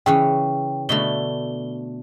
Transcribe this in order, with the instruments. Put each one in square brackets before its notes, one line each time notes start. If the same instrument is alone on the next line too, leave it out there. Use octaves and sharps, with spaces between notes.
[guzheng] C#3 E3 C#4 [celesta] G5
[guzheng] B2 D3 A3 [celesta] G7